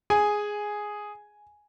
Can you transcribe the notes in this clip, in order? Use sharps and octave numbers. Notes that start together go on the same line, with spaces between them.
G#4 G#5